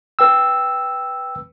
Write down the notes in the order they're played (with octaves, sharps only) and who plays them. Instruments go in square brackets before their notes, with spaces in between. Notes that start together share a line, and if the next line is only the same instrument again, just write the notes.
[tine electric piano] B4 G5 E6